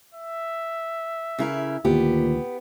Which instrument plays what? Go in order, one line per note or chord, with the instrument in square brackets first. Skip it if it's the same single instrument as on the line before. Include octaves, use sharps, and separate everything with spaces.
[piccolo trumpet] E5
[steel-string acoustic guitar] C#3 E4 A#4
[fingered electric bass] D2 D#3 [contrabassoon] A#2 [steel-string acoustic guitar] B3 G4